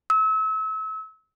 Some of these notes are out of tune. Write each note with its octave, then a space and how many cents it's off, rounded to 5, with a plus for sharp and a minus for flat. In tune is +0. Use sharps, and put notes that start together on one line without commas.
E6 -35